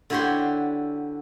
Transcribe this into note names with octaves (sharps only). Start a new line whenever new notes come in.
D3 E4 F#4 G4 C#5 C6